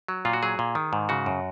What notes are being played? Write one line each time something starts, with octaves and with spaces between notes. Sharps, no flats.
F#3
A#2 F4
F#4
F#3 G#4
A#2
D#3
G#2
C#3 F#4
F#2